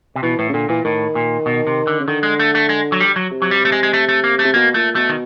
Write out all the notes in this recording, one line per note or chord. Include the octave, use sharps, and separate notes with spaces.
C3
B2 E3
A2 E3
C#3
A#2 D3
A#2 E3
A2 D#3
A#2
B2
C3
D3
C#3
D3 D#3
G#3
A3
A3
G#3
F#3
G3
F#3
C3
F#3
G3
A3
G#3
G#3
A3
A3
A#3
A3
C3
B2 A#3
A#2 A3
B2 A3
D#3